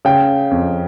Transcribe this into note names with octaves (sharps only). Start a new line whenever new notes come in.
C#3 G5
F2